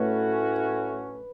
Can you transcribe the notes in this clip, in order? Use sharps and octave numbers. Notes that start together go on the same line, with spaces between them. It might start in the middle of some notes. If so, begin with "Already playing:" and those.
Already playing: A2 A3 C#4 F#4 B4